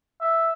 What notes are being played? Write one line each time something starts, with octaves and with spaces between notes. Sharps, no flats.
E5